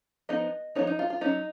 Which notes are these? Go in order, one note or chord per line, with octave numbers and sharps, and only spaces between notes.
F3 B3 D#4 D#5
F3 B3 D#4 C#5
D#4
F4
F4
F#3 C#4 D#4